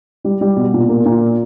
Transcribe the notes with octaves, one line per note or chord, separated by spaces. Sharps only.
G3
G3
B2
A#2
A#3
A#2